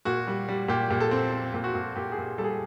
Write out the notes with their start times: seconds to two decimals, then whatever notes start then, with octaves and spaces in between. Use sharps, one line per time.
0.05 A#2 F#4
0.27 G3
0.48 G3
0.68 A#2 G4
0.91 A#2
1.00 A4
1.11 C4
1.32 C4
1.54 A#2
1.64 F#4
1.75 A#2
1.96 A#2 G4
2.12 G#4
2.18 A#2
2.38 G3 A4
2.44 G#4